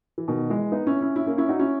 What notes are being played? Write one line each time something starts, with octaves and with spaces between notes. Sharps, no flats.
E3
B2 D#3
E3 G#3
B3 D#4
C#4 E4
C#4 E4
C#4 E4
A#3 C#4
C#4 E4
D#4 F#4
C#4 E4